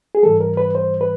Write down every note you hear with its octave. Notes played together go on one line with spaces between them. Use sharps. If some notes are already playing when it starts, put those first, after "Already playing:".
G#4
G#2 E3 G3 A4
A#4
B4
C5
B4